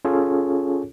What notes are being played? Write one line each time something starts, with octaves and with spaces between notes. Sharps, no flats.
C#4 F4 G#4 A4 C#5